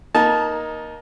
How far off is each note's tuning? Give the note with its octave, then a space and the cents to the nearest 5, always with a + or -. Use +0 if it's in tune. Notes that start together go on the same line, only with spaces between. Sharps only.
A#3 +15 D#4 +0 A5 -15